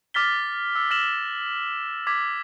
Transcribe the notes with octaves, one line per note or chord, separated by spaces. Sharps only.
D6 F6 A6 B6 G7
E6
F6 A#6 E7 F#7
D6 G#6 B6